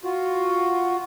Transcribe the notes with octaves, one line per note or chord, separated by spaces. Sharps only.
F4 F#4